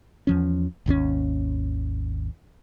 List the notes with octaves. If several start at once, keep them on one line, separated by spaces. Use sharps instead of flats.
E2 F3 C#4
G#1 D#2 D#3 C#4